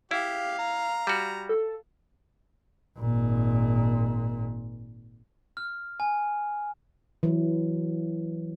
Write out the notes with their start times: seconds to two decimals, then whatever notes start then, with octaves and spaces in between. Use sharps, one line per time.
0.11 E4 G4 F5
0.59 A#5
1.07 G3 F#4
1.49 A4
2.98 G#1 A#2
5.57 F6
6.00 G#5
7.23 E3 F#3